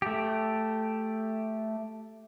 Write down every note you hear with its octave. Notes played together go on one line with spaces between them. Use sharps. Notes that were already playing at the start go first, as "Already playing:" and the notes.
A3 G4